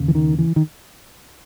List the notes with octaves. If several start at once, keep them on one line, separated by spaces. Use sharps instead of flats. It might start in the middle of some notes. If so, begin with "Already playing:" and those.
Already playing: D#2 C#3
E3
D#3
E3
D#3